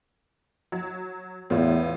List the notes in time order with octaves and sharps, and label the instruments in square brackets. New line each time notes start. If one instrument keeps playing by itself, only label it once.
[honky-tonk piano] F#3
[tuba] E2 [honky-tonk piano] A2 F4